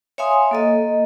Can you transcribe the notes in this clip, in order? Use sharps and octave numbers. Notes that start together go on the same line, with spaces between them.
C#5 E5 F5 G#5 C6 D#6
A#3 A4 D#5